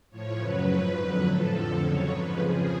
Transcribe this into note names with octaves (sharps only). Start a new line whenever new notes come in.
A2 F3 C#5
F#2 C#3 F#3 B4
G#2 F3
F2 D3 F#3
A2 F3 A4
F2 D3 F3
F2 C#3 F#3 C#5
G#2 F3 B4
F2 C#3 F3 G#4